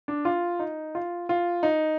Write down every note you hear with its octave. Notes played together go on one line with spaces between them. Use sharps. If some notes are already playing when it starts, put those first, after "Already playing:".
D4
F4
D#4
F4
F4
D#4